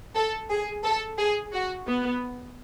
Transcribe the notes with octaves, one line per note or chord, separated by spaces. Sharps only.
A4
G#4
A4
G#4
F#4
B3